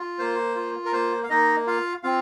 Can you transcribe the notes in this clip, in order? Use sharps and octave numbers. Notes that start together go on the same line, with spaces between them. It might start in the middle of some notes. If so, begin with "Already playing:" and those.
Already playing: F4
A#3 C5
F4
A#4
A#3 C5
F5
A#3 D#4 D#5
F4 F5
C4 F4 F5